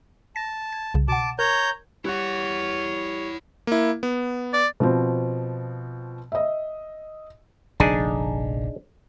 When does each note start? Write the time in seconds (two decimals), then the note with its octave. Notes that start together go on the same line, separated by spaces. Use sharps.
0.36 A5 A#6
0.73 G#6
0.94 C2 C#3
1.08 B2 F#5 A5 D6
1.39 A#4 C#5 A#5 G6
2.05 G3 E4 C#5 F#5 F#6
3.67 A#3 E4
4.03 B3
4.53 D5
4.80 B2 F3 C4
6.32 D#5 E5
7.80 F1 A#1 D3 D4 D#4 G#4